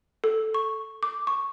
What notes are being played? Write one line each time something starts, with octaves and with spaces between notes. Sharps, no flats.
A4
C#6
D6
C#6